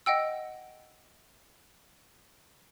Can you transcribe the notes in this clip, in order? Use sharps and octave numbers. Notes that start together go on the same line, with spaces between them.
D#5 F#5 G5 E6